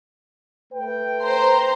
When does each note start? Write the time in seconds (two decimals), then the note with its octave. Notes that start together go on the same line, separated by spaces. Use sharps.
0.72 A3 B4 G5
1.22 C5 A#5 C6